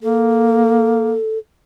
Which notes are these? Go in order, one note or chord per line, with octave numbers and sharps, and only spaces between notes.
A#3 A4